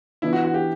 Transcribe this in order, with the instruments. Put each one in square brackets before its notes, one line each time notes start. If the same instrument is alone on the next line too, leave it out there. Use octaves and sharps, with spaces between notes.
[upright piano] E3 B3 D4 [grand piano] E4
[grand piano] F#4
F#4
G4